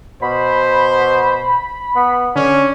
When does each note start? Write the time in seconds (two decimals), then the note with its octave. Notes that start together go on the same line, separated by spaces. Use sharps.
0.22 B2 C5 B5
1.96 B3
2.36 D3 C#4 D4